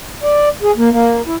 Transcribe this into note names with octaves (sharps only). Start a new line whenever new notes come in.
D5
G#4
A#3
A#3
E4